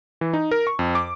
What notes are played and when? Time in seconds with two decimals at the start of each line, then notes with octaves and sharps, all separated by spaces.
0.21 E3
0.33 D#4
0.51 A#4
0.67 C#6
0.79 F2
0.95 D6